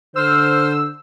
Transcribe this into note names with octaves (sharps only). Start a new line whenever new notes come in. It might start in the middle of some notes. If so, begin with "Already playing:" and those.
D3 C5 E6 F6